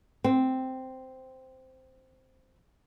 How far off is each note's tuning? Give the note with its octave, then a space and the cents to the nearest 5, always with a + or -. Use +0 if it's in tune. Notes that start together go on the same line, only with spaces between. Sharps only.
C4 -5